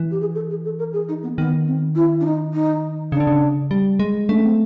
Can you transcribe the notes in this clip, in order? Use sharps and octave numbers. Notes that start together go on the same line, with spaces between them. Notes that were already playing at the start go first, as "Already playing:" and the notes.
Already playing: E3
G4
G#4
A4
G#4
A4
A#4
G#4
D#4
B3
D#3 B3
C4
E4
D4
D#4
D#4
C#3 D4
D3
C#3
G3
G#3
A3 D4
C#4
C4